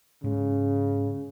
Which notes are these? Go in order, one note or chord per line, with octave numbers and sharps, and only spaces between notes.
G#2 C#3 G#3